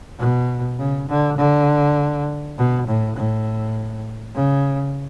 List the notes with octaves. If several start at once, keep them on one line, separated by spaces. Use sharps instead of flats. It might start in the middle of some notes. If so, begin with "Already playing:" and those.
B2
C#3
D3
D3
B2
A2
A2
C#3